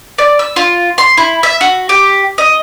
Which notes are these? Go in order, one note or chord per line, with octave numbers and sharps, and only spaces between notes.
D5
E6
F4
C6
E4
E5
F#4
G4
D#5